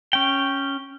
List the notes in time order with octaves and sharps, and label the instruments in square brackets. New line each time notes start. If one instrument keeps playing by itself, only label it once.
[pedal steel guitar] C#4 G5